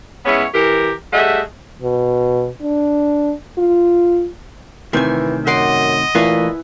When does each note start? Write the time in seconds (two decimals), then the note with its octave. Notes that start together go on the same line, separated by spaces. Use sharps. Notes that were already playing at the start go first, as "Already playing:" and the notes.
0.25 G#3 B3 C#4 E4 C#5
0.53 E3 G4 A#4
1.12 G3 A3 G#4 D#5 E5 F#5
1.82 B2
2.62 D4
3.58 F4
4.93 A2 C3 D#3 E3 E5 G#5
5.47 F#2 D#5 F#5 C6 D6
6.15 A#2 E3 A3 E4 F4 B4 G#5